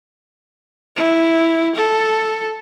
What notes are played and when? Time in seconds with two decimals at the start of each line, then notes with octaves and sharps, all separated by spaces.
0.96 E4
1.75 A4